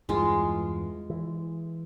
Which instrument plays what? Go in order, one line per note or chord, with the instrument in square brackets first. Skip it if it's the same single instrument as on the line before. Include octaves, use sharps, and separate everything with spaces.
[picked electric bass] E2 G2 E3 [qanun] G#3 F4
[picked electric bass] E3